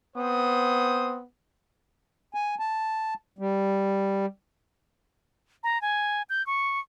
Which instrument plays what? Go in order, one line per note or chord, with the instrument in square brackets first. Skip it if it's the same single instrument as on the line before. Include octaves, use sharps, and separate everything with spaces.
[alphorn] B3 [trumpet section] C4 C5 D#6
[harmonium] G#5
A5
G3
[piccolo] A#5
G#5
G6
C#6